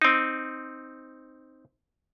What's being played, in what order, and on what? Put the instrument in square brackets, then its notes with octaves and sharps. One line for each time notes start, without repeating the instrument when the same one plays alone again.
[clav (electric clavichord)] C4 D#4